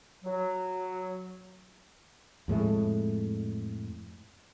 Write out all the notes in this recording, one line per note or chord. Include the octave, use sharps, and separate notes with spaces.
F#3
F2 A2 G#3 A3